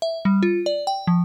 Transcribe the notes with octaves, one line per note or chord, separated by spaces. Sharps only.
E5
G3
F4
D5
G5
F3